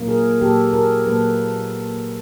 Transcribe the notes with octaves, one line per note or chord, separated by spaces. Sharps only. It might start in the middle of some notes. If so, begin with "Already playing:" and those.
Already playing: A#2 F#3 A#3
G#4 A#4
A#2 F#3 A#3 G4 A4
G#4 A#4
A#2 F#3 A#3 A4 B4